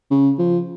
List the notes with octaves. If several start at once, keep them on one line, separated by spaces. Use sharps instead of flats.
C#3
F3